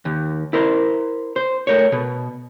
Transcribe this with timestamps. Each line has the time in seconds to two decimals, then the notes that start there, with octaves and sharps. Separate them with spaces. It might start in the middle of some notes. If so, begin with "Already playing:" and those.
0.05 D#2
0.53 E4 A#4 C5
1.36 C5
1.67 A3 A#4 C#5
1.92 B2